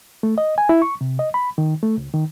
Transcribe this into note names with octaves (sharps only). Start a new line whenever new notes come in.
A3
D#5
G#5
E4
C#6
C3
D#5
B5
D#3
A3
C#2
D#3